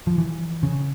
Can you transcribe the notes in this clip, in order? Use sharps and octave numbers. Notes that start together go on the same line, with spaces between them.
F3
E3
C#3